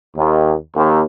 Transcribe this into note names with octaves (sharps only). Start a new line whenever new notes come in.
D#2
D#2